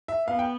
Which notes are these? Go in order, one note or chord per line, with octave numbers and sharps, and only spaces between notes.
E5
B3 F5
G5